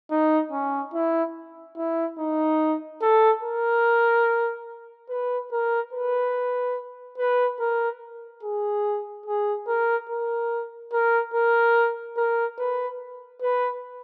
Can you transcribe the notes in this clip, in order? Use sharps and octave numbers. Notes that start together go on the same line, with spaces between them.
D#4
C#4
E4
E4
D#4
A4
A#4
B4
A#4
B4
B4
A#4
G#4
G#4
A#4
A#4
A#4
A#4
A#4
B4
B4